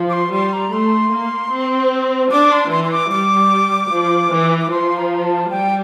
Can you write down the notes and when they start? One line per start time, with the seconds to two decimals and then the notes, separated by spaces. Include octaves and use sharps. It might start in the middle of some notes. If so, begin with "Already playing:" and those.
Already playing: F3
0.09 D6
0.13 C6
0.32 G3 C6
0.53 A#5
0.73 A3 C6
1.13 A#3
1.52 C4
2.31 D4 D6
2.52 C6
2.71 E3 C6
2.84 C6
2.92 D6
3.12 G3 D6
3.91 F3
4.31 E3
4.61 D6
4.71 F3 C6
4.97 A#5
5.14 A#5
5.24 A5
5.51 G3 G5